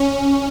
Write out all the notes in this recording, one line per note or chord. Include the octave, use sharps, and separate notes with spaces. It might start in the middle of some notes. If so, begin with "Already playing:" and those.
Already playing: C#4